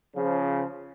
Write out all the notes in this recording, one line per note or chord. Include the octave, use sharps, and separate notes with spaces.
C#3 F3